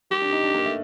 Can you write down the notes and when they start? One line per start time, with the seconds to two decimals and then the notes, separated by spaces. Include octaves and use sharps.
0.10 G3 G4
0.22 D4
0.32 D#4
0.43 D4
0.54 A#3
0.65 A3